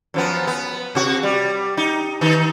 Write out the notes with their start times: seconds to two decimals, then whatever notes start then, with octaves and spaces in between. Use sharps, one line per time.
0.14 F#2 F3 B3
0.47 B3
0.95 C3 F#4
1.23 G3
1.77 D#4
2.21 D#3 D#4